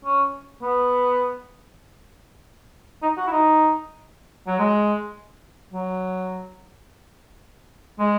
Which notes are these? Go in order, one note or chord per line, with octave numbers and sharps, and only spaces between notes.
C#4
B3
D#4
F#4
E4
D#4
F#3
G#3
F#3
G#3